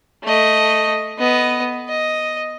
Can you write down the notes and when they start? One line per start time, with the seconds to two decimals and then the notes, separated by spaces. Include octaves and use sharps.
0.24 A3 D#5
1.19 B3 D#5
1.89 D#5